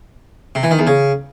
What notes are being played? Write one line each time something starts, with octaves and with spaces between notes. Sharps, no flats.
C3
E3
D#3
E2
C#3